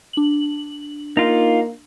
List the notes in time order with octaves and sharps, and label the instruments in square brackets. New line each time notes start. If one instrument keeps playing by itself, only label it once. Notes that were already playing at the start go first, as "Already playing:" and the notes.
[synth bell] D4 F#7
[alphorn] A#3 [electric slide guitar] D#4 F4